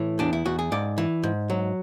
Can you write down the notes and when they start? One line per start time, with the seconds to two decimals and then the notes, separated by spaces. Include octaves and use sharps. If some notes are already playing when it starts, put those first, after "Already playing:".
Already playing: A2 E3
0.19 E2 D4
0.33 E4
0.46 E2 F#4
0.59 G#4
0.72 G#2 D5
0.98 E3
1.23 G#2
1.50 F#3